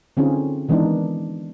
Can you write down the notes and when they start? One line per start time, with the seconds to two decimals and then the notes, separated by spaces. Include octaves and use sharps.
0.17 D3 C4 C#4 D#4 F4 G#4
0.69 D#3 E3 G#3 B3 D4 D#4